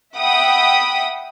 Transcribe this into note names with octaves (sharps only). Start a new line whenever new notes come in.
E5 F#5 G5 B5 D#6